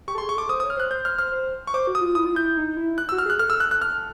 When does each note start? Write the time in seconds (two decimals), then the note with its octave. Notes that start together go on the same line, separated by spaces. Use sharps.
0.08 G4 C#6
0.15 A4
0.18 C6
0.22 G#4
0.29 C#6
0.35 A4 D6
0.49 C5 D#6
0.60 D#6
0.63 C#5
0.70 F6
0.77 C5 F#6
0.91 C5 G6
1.05 C5 F6
1.18 C5 F6
1.32 C5
1.67 C#6
1.74 C5 D6
1.87 F#4
1.95 D#6
2.01 F4
2.15 E4 D#6
2.25 F4
2.35 E4 G6
2.57 D#4
2.77 E4
2.98 F#6
3.09 E6
3.12 F#4
3.18 F6
3.26 G#4 F#6
3.39 A4 F6
3.50 E6
3.60 F#6
3.71 F#6
3.82 F6